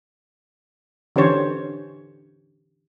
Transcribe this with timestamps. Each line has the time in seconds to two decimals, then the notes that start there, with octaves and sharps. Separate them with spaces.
1.16 D3 E3 C#4 G4 C5 C#5